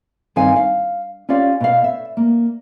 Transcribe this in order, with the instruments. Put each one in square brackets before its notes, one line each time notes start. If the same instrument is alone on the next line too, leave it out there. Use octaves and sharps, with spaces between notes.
[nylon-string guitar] G2 D#3 C4 F5 G#5
F5
C#4 F4 G4 D5 F5
B2 F5
E5
A#3